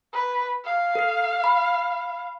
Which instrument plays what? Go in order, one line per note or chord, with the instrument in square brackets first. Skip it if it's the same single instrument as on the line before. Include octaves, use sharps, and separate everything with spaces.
[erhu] B4
F5
[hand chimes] A4 C7
B5